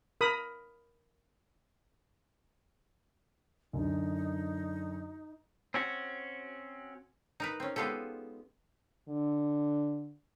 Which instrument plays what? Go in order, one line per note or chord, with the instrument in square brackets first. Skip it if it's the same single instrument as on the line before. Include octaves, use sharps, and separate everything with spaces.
[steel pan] A#4 B5 D#6
[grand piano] F#2 D3 [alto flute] D#4
[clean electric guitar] C4 C#4 F#4
[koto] D#4 A#4 B4
C4 C#4
G#3 B3 F4 G4 A4
[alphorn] D3